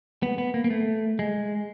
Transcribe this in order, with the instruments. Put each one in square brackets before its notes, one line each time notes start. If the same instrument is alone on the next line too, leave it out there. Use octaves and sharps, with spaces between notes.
[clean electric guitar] B3
B3
A#3
A#3
A3
G#3